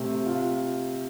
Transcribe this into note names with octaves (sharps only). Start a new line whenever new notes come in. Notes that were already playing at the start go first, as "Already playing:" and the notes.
Already playing: C3 A3
F4